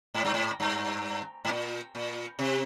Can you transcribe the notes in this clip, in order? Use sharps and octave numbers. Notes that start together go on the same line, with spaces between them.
G#2
G2
G#2
G2
G#2
A#2
A#2
C3